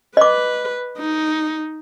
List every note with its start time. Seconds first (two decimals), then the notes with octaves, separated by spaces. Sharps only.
0.17 B4 D#5 D6
0.98 D#4